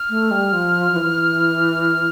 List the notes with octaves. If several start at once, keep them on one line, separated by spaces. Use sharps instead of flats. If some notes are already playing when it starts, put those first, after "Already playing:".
Already playing: F6
A3
G3
F3
F3
E3